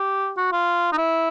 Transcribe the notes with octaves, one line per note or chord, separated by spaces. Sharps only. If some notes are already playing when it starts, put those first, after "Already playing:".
Already playing: G4
F#4
F4
D#4
E4